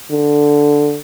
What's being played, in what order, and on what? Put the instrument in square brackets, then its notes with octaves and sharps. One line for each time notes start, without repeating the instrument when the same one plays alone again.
[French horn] D3